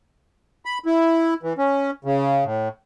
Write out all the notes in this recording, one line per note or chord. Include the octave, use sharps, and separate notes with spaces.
B5
E4
E3
C#4
C#3
A2